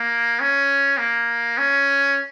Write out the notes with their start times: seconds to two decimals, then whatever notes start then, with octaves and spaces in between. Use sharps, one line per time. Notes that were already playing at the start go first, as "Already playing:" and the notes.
Already playing: A#3
0.40 C#4
0.98 A#3
1.57 C#4